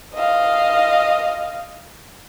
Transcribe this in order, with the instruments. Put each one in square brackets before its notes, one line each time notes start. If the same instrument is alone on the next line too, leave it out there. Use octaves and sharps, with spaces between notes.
[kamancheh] D#5 F5